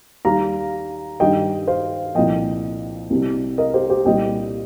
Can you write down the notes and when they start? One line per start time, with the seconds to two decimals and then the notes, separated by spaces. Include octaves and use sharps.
0.25 D#2 D#3 G3 F5 A#5
1.20 G2 D#3 G3 D#5 G5
1.67 C5 F5
2.15 C2 A#2 F3 D#5 G5
3.10 C2 C3 G3
3.58 A#4 D#5
3.74 G4 C5
3.89 G4 C5
4.05 C2 A#2 G3 D#5 G5